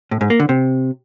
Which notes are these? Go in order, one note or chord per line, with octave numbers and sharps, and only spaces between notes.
A2
G#2
A#3
D3
C3